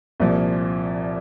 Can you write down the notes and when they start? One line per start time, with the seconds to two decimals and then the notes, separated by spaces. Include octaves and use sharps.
0.20 C2 A#2 F3